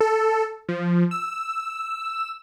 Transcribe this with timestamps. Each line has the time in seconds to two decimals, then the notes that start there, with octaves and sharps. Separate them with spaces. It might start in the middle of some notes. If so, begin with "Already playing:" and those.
0.01 A4
0.69 F3
1.11 E6